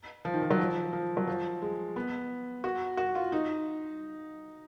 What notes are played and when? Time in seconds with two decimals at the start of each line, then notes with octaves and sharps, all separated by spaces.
0.25 F3
0.34 D#3
0.43 F3
0.50 F#3
0.59 F3
0.93 F3
1.17 F#3
1.27 F3
1.62 G#3
1.96 B3
2.64 F#4
2.97 F#4
3.15 F4
3.32 D#4